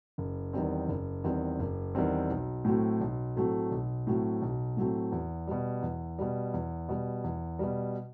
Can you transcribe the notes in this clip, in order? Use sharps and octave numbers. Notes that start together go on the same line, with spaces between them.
F#1
E2 D#3 G3 C4
F#1
E2 D#3 G3 C4
F#1
E2 D#3 G3 C4
B1
A2 F#3 A3 C4
B1
A2 F#3 A3 C4
B1
A2 F#3 A3 C4
B1
A2 F#3 A3 C4
E2
B2 G3
E2
B2 G3
E2
B2 G3
E2
B2 G3